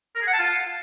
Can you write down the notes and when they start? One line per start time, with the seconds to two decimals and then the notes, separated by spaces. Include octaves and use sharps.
0.15 A#4
0.21 G#4
0.27 F#5
0.33 A5
0.39 F4